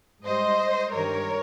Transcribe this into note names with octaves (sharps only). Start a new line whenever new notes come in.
G#2 G3 C5 D#5
G2 D#3 G3 A#4 C#5